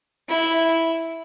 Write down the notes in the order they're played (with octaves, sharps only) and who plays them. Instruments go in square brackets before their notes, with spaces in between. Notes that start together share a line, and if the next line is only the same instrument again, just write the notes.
[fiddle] E4